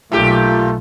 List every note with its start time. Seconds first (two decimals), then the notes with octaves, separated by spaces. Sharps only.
0.12 B1 A#2 A3 F4 G4